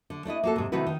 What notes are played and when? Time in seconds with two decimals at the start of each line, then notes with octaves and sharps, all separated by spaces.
0.10 D3
0.25 A3 D4 E4 D#5
0.43 A#3 F#4 A4
0.56 G#2 C3
0.72 C3 D#3 A3 E4 F#4 B4
0.86 D#3